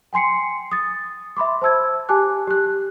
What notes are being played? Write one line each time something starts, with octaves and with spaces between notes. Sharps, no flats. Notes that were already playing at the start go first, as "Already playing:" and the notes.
G5 G#5 C6 C7 C#7
D#6 A6
E5 B5 C6 D6
C5 A5 E6 G#6
G4 G#5 A5 D6 F#6
G4 F#6